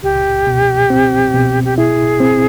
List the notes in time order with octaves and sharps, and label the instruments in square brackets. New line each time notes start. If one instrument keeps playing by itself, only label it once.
[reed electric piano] C#2 [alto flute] G4
[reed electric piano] B2
C4
B2
[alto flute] G4
[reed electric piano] E4 [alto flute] G#4
[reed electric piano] C4